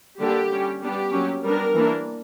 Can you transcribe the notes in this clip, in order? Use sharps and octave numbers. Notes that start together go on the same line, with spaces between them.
D3 G3 A#3 D4 G4
G3 C#4
G3 B3 D4 G4
F#3 A#3 C#4
G3 B3 D4 A#4
E3 A#3 D4